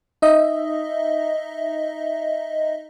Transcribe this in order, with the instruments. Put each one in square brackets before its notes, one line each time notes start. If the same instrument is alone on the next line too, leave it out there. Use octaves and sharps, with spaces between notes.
[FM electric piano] D#4 D#5 E5